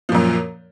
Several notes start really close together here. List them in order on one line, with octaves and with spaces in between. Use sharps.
F3 A#2 F#2